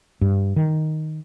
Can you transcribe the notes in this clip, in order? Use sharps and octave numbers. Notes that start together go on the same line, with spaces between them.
G2
D#3